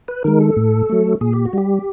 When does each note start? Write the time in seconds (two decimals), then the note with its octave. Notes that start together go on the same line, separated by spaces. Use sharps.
0.08 B4
0.24 D#3 G#3 A#4
0.40 A4
0.57 A2
0.89 F#3 A3
1.21 A#2 G#4
1.33 G4
1.45 F#4
1.53 G3 G4